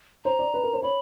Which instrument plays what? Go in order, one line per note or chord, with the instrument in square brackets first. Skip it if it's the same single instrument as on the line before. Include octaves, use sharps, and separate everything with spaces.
[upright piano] C5 [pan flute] A#5
[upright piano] D5
B4
A#4
C5
[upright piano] C#5 [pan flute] B5